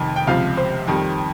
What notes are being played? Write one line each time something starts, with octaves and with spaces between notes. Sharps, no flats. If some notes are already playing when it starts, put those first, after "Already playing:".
Already playing: F1 F2 D#3
G5
C#2 C3 F3 F5
C5
F2 D#3 G3